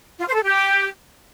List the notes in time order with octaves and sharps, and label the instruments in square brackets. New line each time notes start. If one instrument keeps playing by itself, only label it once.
[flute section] F4
C5
A4
G4